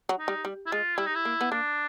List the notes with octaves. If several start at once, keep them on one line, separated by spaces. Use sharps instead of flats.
F#3
D#4
G3
G3
E4
G#3 F4
G3 E4
D#4
E4
A#3
B3
A#3 D4